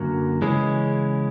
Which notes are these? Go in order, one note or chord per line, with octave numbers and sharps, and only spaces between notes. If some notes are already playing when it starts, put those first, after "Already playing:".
Already playing: F#2 D3 F#3 A#3
C#3 E3 G#3 C#4